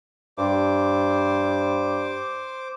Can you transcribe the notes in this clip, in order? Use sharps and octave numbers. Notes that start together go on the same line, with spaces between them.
G2 C5 D6